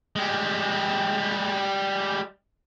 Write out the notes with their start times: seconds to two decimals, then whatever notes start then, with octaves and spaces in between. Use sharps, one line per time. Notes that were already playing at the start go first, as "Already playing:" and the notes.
0.16 G3 G#3